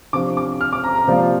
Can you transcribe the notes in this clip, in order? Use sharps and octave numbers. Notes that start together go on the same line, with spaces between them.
C3 F3 D4 D6
D6
F6
D6
A#5
A#5
C3 F3 A#3 F4 D5